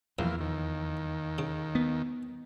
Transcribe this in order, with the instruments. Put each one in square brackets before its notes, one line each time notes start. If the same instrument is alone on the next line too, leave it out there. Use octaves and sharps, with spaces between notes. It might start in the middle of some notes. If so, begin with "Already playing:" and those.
[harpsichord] A#1 [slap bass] E2 [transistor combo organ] E3 A#3 F4
[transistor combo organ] D#2 D#3
[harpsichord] C#3
[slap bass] B3